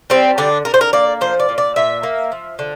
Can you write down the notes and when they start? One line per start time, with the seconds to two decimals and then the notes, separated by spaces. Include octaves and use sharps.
0.10 G3 C4
0.38 D3 D4
0.65 D3 A#4
0.74 C5
0.81 A#4
0.93 A#3 D5
1.21 F3 C5
1.40 D5
1.49 A#2
1.58 D5
1.76 A#2 E5
2.03 A#3
2.32 F3
2.59 D3